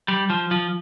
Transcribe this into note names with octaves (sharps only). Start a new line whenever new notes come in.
G3
F3
F3